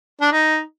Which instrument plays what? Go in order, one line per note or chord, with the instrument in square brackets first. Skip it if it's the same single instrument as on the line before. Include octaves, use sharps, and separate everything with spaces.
[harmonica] D4
D#4